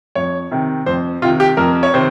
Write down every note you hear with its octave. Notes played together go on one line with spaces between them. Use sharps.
F2 C#5
C3 D#3
F2 C5
C3 D#3 F4
G4
F2 A#4
C#5
C3 D#3 C5